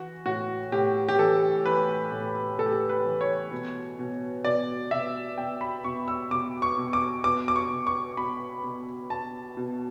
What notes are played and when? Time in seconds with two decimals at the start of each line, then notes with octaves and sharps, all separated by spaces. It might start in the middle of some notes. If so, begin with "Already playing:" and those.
Already playing: E3 F#4
0.26 A2 F#4
0.72 A2 G4
1.08 G4
1.19 E3 A4
1.66 E3 B4
2.12 A2
2.59 A2 A4
2.66 G4
2.73 A4
2.89 B4
3.06 E3
3.21 C#5
3.51 B2
3.99 B2
4.45 B2 D5
4.91 B2 E5
5.38 B2 G5
5.61 B5
5.84 B2 C#6
6.08 E6
6.31 B2 D6
6.62 C#6
6.78 B2
6.93 D6
7.24 B2 D6
7.48 D6
7.56 C#6
7.70 B2
7.87 C#6
8.17 B2 B5
8.64 B2
9.10 B2 A5
9.57 B2